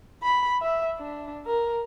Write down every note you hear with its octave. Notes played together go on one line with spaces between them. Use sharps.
B5
E5
D4
A#4